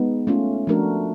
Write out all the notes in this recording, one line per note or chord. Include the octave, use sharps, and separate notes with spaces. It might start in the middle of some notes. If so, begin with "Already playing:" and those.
Already playing: G#3 B3 D#4
A3 C#4 F4
F3 A3 D4 F#4 A#4